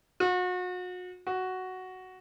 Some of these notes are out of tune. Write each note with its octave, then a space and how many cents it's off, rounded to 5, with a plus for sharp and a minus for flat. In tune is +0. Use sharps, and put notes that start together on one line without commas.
F#4 -35
F#4 +5